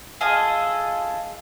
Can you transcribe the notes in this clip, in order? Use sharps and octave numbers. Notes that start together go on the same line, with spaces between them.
F4 G#4 A4 D#5